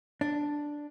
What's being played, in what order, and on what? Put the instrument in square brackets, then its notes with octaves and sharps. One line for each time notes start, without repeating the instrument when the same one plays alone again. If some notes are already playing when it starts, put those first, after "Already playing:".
[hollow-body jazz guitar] D4